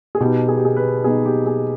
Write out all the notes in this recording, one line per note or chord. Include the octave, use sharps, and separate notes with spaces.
G#4
B2 B3 D#4 G4
G#4
G4
G#4
B4
B2 B3 D#4 G#4
G4
G#4